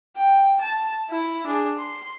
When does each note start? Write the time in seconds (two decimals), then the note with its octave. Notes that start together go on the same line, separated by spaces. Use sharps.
0.17 G5
0.61 A5
1.11 E4
1.46 D4 G#4
1.78 C6